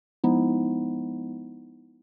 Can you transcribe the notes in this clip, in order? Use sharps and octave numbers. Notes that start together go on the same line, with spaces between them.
F3 G#3 B3 D#4 E4